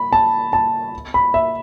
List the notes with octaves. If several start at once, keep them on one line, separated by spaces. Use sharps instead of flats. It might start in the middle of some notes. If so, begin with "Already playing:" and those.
Already playing: B5
A5
A5
B5
E5